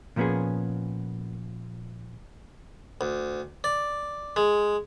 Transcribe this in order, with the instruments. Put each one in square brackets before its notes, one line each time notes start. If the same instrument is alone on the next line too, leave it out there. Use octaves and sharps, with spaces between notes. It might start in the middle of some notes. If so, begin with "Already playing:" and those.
[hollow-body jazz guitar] A#2 F3 A#3 B3 C#4 G#4
[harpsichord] D2
D5
G#3